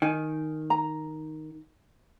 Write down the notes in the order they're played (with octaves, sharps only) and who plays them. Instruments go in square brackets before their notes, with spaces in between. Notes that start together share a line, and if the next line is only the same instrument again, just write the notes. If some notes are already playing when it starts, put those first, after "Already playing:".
[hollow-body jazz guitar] D#3 [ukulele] G#5
[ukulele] A#5